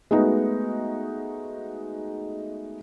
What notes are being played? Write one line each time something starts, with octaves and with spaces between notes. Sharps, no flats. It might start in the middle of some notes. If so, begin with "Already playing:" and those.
G#3 A3 B3 D#4 F#4